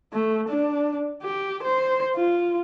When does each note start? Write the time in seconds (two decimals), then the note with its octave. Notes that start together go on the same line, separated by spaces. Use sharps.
0.12 A3
0.48 D4
1.22 G4
1.63 C5
2.16 F4